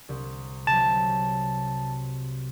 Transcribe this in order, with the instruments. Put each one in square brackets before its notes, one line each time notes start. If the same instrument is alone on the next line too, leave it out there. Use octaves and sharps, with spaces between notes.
[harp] C2
[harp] C3 F#3 [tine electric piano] A5